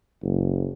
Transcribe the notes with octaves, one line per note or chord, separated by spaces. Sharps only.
F#1